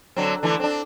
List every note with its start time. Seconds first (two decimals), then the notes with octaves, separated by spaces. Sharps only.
0.17 D3 F#3 C4
0.43 D3 E3 A3
0.60 C4 D4